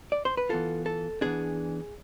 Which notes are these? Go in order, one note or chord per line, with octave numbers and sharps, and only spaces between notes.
D5
C5
B4
E3 B3 F4 A4
A4
E3 B3 D4 G#4